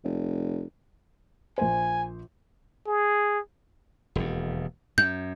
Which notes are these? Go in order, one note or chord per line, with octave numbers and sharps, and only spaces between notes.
F1
A#1 C5 G#5
G#4
E1 D#2
F#2 G6